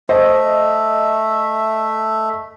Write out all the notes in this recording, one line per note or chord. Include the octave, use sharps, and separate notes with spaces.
A3 C5 D#5 E5